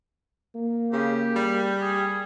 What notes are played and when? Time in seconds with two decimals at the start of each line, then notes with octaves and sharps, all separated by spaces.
0.56 A#3
0.93 C#3 G4
1.36 G3
1.81 G#4